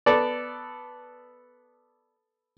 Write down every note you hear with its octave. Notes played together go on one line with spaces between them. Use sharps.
B3 A4 D5